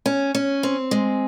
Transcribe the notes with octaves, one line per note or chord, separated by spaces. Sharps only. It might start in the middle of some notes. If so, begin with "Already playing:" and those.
C#4
C#4
C4
G#3